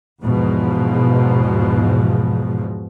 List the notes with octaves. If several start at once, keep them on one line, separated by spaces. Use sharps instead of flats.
E2 G#2 B2 F3